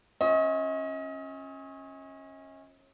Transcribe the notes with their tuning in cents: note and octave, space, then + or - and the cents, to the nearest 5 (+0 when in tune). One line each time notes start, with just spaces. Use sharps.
C#4 -25 F4 +0 D#5 +35